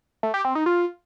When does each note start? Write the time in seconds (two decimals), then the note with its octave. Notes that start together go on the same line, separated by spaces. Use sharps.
0.23 A3
0.34 G4
0.45 C4
0.55 D#4
0.66 F4